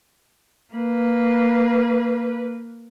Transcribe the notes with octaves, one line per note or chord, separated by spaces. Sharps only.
A#3 B4